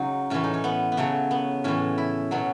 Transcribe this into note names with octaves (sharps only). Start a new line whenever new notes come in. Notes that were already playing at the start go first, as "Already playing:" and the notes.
Already playing: C#3 F#3 D#4
A2 E3 C#4
D#4
C#4
B3
B3
C#3 F#3 A3
B3
A2 E3 C#4
E4
B2 F#3 C#4